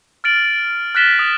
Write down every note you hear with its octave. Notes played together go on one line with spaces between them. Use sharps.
F6 A6 D7 F#7
F6 F#6 A6 B6 E7 G7
D#6